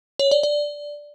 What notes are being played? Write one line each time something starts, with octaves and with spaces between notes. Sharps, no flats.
C#5
D5
D5